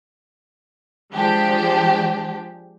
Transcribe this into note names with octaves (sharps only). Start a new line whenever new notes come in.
F3 G#3 D4 G4